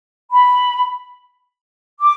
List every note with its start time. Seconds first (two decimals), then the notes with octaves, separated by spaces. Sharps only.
0.31 B5
1.99 D6